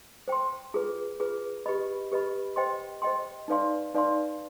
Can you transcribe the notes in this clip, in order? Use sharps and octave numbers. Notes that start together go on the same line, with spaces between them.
C5 G5 C6
F4 G#4 B4
F4 G#4 B4
G4 B4 D#5 B5
G4 B4 D#5 B5
C5 D#5 G5 C6
C5 D#5 G5 C6
D#4 B4 D5 F5 C6
D#4 B4 D5 F5 C6